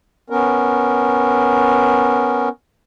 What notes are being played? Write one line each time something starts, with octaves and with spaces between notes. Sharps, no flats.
B3 C#4 A#4